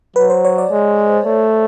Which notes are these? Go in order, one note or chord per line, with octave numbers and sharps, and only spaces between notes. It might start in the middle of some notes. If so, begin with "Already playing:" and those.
F#3 B4
C5
C#5
D5
G#3
A3